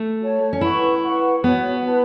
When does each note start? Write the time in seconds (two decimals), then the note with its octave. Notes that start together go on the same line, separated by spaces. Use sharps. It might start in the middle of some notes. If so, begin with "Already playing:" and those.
Already playing: A3
0.21 F#4 C#5 A5
0.53 C#4
0.61 E4 B4 F#5 C#6
1.03 B4 F#5 C#6
1.44 B3 F#4 C#5 A5
1.85 E4 B4 A5